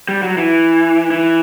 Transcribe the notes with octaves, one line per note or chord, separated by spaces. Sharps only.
G3
F#3
E3
E3